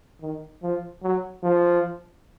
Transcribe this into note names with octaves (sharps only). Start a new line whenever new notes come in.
D#3
F3
F#3
F3